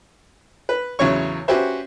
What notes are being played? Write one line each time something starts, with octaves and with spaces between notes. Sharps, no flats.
B4
A1 E2 C#3 F#3 C#5 C#6
C#4 F#4 G4 B4 C5 E5